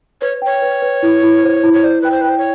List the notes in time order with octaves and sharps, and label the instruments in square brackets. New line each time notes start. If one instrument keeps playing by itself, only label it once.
[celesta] B4 [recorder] C#5
[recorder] C#5 [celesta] G5
[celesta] B4
B4
E4
E4
C5
E4
[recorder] C#5
[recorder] C5 [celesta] D5
[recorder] B4 [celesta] G5
[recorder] C5
[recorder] B4 [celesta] G5
[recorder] C5
C#5